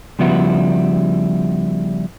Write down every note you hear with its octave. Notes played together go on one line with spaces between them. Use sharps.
C#3 F3 G3 B3 E4 F#4